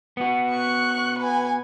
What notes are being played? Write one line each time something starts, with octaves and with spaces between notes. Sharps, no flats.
B3 F#4
C#6 F#6
B4 G#5